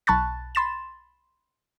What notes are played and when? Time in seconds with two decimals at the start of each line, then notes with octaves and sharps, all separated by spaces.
0.07 B1 A5 B5 C#6 F#6 A6
0.55 B5 C6 A6 E7